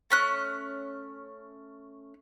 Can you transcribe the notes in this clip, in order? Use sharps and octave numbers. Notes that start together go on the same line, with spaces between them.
A3 C#4 F#6